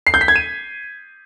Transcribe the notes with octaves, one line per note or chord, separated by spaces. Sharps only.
C7
G6
B6
G#6
D#7